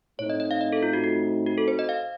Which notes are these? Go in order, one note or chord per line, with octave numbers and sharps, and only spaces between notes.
A2 A3 C4 D#4 C#5
D#5
D#5
F5
D#5
A4
F4
F#4
F#4
F#4
A4
C5
D#5
F5